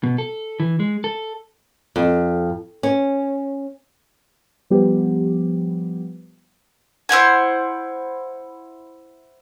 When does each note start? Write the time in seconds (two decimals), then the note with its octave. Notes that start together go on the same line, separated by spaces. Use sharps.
0.03 B2
0.18 A4
0.60 E3
0.80 G#3
1.04 A4
1.96 F2
2.83 C#4
4.70 F3 G3 B3 G4
7.09 E4 C5 F#5 G#5